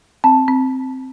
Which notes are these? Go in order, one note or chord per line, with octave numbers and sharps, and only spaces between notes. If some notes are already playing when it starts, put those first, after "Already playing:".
C4 A5
C4